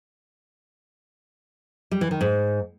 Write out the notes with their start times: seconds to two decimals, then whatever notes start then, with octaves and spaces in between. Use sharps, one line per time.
1.91 G3
2.01 E3
2.11 D#3
2.21 G#2